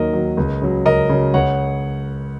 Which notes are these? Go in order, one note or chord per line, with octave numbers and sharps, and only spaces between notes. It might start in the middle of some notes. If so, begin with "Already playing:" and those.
Already playing: D#2 D#3 F#3 A#4 D#5
D#3 F#3
C#2
C#3 F#3
C#2 A#4 D#5
C#3 F#3
C#2 C#5 F#5